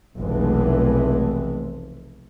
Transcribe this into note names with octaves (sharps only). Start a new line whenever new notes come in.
F1 B1 F2 E3 G#3 A3